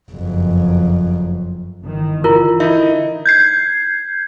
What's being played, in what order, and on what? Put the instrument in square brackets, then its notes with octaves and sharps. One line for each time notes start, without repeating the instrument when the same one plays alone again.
[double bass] F#1 F2
[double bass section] G1 D#3 E3
[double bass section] D3 E3 [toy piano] E4 F4 A#4
[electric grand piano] D#4 E4 D#5 [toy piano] E5
[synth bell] G6 G#6 C7